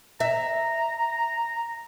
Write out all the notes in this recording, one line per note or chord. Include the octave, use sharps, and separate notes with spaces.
E5 A#5